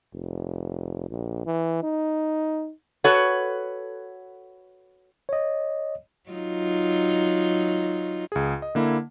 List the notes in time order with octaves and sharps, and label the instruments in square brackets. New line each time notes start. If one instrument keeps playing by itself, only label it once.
[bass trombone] F1
A#1
E3
D#4
[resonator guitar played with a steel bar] F#4 A4 B4 C#5 F#5
[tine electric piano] C#5 D#5
[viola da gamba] F#3 D#4 F4
[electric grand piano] C#2 G#4
D#5
D3 A#3 E4